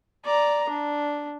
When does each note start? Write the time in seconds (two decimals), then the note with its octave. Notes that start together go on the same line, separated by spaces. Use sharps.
0.25 D5 A#5
0.69 D4